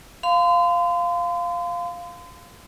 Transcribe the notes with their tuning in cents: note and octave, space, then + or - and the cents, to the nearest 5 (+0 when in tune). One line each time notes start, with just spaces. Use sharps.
F5 +0 C6 -40